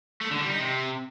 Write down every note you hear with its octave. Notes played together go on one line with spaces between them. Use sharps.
A3
D3
G3
D#4
C3